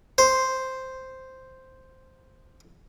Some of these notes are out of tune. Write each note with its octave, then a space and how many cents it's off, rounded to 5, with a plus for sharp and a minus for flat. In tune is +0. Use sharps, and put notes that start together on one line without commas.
C5 +0